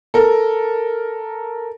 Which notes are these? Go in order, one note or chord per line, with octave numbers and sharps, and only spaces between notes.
A4 A#4